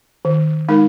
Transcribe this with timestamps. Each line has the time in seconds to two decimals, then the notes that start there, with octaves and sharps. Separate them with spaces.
0.25 D#3
0.68 G#3 D#4 A#4